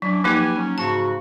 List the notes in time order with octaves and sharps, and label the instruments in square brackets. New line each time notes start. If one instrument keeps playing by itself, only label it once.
[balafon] F#3 [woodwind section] C#4 D4 E4
[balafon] F3 A#3 D#4 [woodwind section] G4 B4 G#5
[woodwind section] F#3 C#4
[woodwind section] G#2 C#3 F#4 [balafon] A5